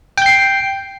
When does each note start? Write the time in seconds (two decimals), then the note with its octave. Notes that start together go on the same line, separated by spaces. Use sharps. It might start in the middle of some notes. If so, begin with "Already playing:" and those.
0.18 G5
0.22 G6
0.26 C7